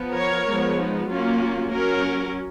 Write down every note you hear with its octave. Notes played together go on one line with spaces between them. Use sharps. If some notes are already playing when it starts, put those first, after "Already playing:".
Already playing: F3 B3
A#4 C#5
F3 G#3 B3
D#4
F#3 A#3 C#4 F4
F#3 C#4 F#4 A#4